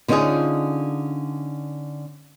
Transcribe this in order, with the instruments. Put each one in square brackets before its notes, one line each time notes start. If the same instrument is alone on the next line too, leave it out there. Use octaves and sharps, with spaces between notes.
[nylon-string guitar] D3 B3 C#4 D#4 F4 G#4